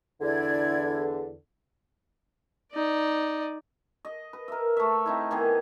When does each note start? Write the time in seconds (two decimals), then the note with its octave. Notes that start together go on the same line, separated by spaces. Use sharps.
0.22 E2 D3 E4 D5 G#6
2.72 D#4 D5
4.05 D#5
4.33 B4
4.48 A#4 E5
4.77 A3 E5
5.06 C4 D#4 E4
5.31 D#3 E3 B3 G#4